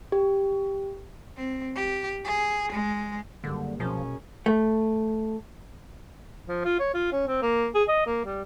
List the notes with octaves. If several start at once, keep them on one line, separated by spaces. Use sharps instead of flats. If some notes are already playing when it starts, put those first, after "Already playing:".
G4
C4
G4
G#4
G#3
F#1 D3 G3 A#3
C2 B2 F3 C#4 G#4 A#4
A3
F3
F4
C#5
F4
C#4
C4
A#3
G#4
D#5
A#3
G3